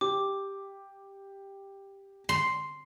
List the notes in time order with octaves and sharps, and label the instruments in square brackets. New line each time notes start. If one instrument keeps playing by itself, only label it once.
[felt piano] G4 [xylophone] D6
[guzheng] C6